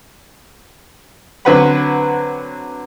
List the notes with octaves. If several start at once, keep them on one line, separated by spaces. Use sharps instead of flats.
D3 F#3 C4 B4 F#5 B5